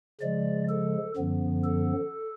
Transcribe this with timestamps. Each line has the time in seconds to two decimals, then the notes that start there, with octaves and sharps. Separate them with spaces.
0.21 C#3 F3 G#3 D5
0.69 A4
1.17 F#2 D3 F3 B3
1.64 A4